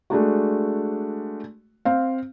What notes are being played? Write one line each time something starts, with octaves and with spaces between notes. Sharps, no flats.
G#3 A3 D4 F#4
C4 F5